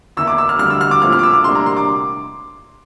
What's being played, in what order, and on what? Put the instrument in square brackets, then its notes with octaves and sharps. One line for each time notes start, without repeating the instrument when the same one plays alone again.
[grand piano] E2 E3 A#3 E4 E6
D6
E6
F6
D2 D3 G3 F6
E6
F6
D6
A#2 F3 A3 C4 E4 F6
F6
D6
E6
D6
C3 G3 A#3 D4 C6
A#5
C6
D6